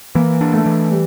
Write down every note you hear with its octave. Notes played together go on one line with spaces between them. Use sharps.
E3 A#3
D4
A3
E3
G3